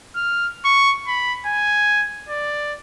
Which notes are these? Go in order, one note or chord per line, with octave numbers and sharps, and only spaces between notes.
F6
C#6
B5
G#5
D5